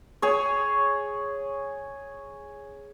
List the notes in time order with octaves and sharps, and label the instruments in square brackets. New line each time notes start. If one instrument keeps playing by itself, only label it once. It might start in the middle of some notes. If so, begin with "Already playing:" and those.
[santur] G#4 C#5